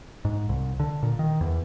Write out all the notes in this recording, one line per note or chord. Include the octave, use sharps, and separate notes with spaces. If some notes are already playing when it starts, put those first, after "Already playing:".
G#2
C2
D3
A#2
D#3
E2